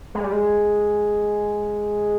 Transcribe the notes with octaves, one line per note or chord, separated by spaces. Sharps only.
G#3
G3
G#3